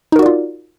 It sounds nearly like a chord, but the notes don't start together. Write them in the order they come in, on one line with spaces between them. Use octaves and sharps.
D#4 A#4 F#4 D5 F4